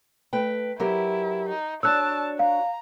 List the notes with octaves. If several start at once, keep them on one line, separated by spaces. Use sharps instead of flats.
A3 B4 G5
F#3 E4 G4 A#4
D#4
D4 F#4 C#5 A5 E6 F#6
F5 A#5